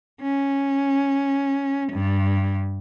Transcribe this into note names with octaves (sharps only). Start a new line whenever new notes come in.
C#4
G2